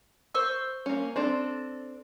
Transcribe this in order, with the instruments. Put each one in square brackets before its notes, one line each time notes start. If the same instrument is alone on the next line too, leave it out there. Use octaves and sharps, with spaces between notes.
[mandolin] C5 C#6 E6
[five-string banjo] A#3 C#4
C4 D4 A4